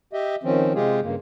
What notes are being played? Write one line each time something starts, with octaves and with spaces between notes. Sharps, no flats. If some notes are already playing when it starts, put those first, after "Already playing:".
G4 D#5 E5
D#3 F3 C4 C#4
C3 G#3 F4 G4 G#4
G2 C#3 A#3